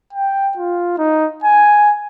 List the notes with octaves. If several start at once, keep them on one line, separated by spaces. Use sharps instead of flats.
G5
F4
D#4
G#5